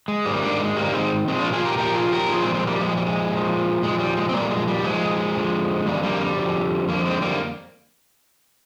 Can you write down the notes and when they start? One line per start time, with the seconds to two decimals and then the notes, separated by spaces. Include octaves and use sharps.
0.08 G#3
0.25 G#2 D#3 G3 A#3
0.42 A#3 D4
0.60 G#3
0.76 G#2 D#3 G3 A#3
0.94 G#3 C4
1.28 A#2 F3 G#3 C4
1.40 D4 F4
1.53 F4 G#4
1.65 G4 A#4
1.78 A#2 F3 G4 A#4
1.95 F4 G#4
2.12 G4 A#4
2.29 A#2 F3 F4 G#4
2.42 G#3 C4
2.54 G#3 C4
2.67 G3 A#3
2.80 A#2 F3 G#3
2.97 G3
3.07 G#3
3.32 A#2 F3
3.83 A#2 F3 G#3
4.00 G3
4.17 G#3
4.29 C4
4.33 A#2 F3 G3 A#3
4.51 G#3
4.68 G3
4.84 A#2 F3 G#3
5.35 F2 D3 F3
5.86 F2 D3 F3 G3 A#3
6.03 G3 A#3
6.21 G3
6.38 F2 D3 F3
6.89 F2 D3 F3 A#3
7.05 G#3 C4
7.22 G3 A#3